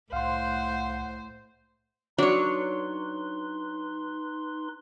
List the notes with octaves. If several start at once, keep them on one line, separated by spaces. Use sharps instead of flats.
C2 A2 C5 F5 F#5 C6
F#3 D4 D#4 B4 C#5 C6